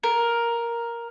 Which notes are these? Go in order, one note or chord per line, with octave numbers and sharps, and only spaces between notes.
A#4